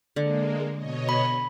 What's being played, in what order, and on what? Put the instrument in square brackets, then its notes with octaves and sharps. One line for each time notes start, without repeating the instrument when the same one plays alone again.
[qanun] D3 [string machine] G#3 A#3
[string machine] B2 C#5 D#5
[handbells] B5